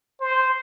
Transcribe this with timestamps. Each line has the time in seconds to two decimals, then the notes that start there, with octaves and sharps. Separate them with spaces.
0.20 C5